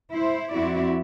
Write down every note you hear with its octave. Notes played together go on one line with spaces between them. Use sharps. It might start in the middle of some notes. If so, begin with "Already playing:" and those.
E4 C5
F2 C4 E4 F#4 D5